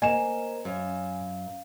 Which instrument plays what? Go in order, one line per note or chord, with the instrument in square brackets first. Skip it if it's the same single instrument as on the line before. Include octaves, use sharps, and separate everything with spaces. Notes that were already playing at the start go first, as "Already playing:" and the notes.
[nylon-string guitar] A#3 [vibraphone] A#4 C5 A#5 [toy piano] D#5 [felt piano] G#5 E7
[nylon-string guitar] F#2 [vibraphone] F5